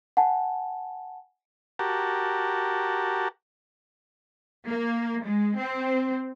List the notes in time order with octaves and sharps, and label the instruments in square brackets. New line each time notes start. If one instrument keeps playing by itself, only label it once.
[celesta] F#5 G#5 A5
[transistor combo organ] F#4 G4 A#4 A5
[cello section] A#3
G#3
C4